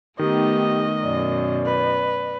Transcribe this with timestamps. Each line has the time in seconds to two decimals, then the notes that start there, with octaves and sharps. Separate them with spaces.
0.19 D#3 A3 B3 D#4 G4 D#5
1.03 F#2 B2 D5
1.66 B4